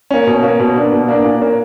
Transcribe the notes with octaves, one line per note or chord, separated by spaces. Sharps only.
A#3 C#4
B2
A#3 C#4
B2
A#3 D4
B2
A#3 D4
A#2
A#3 C#4